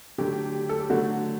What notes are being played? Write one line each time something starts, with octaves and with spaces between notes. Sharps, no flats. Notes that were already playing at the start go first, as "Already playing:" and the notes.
D3 F#3 A3 G4
A4
G4
D3 F#3 A3 F#4